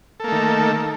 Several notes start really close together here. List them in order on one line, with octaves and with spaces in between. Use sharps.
A4 A#3 A3 D#3